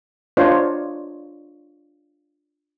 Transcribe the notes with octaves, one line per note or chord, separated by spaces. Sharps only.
D4 F4 C5 C#5 D#5